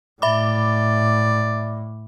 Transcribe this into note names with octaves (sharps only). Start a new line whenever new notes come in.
A2 D5 E5 B5 D6